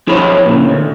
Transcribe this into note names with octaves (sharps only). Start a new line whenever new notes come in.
F3 E4 G#4 C#5 B5
A#2 C#3
D2